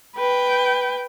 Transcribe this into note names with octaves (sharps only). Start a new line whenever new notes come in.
B4 G5